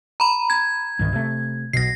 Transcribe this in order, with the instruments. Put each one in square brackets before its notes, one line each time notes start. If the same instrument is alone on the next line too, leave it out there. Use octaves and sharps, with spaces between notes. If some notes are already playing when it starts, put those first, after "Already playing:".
[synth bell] A#5 B5
G#6
[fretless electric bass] C2 G#2 D#3
C3 A3
[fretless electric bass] B1 B2 [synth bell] A#6 C7